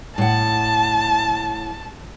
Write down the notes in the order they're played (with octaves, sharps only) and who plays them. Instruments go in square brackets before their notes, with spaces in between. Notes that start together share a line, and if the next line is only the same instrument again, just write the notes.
[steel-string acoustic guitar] A2 F#5 [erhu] A5